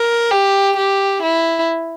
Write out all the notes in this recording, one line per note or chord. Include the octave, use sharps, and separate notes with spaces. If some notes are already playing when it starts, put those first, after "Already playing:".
Already playing: A#4
G4
G4
E4